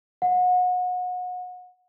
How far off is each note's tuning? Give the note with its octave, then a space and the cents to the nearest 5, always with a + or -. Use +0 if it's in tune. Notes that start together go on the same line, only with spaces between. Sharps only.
F#5 -30